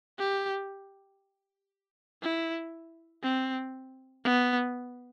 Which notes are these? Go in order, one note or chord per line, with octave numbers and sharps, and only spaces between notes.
G4
E4
C4
B3